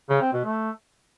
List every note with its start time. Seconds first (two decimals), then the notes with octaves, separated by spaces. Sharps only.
0.09 C#3
0.21 C4
0.33 B2
0.44 A3